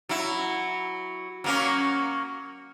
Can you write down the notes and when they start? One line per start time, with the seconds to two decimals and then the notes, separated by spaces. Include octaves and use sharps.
0.09 F#3 E4
1.44 F#3 A#3 C#4